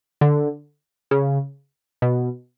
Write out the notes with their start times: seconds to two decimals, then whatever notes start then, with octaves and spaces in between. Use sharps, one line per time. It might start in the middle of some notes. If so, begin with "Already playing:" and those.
0.21 D3
1.11 C#3
2.02 B2